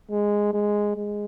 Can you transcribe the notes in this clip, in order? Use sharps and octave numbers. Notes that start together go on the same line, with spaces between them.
G#3
G#3
G#3